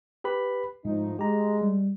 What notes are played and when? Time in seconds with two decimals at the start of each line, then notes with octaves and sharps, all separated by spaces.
0.24 G4 B4 B5
0.85 G#2 F3 A3 D#4
1.19 G#3 G4 A#5
1.62 G3